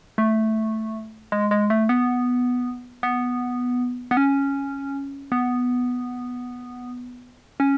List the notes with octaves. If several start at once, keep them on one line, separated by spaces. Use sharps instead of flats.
A3
G#3
G#3
A3
B3
B3
B3
C#4
B3
C#4